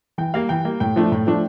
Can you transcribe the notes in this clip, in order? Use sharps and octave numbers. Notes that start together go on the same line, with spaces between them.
E3 G5
G3 A#3 F5
E3 G5
G3 A#3
A2 G5
F3 A3 D4
A2
F3 A3 D4